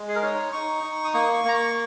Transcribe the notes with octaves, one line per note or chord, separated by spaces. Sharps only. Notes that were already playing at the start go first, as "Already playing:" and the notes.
Already playing: G#3
G#4
A#4
D#4 C#5
D#4 C#6
D#4
D#6
A#3 C#6
C#6
A#3 A#5
C#6